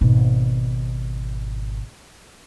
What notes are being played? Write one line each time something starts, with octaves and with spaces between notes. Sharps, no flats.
G#1 B2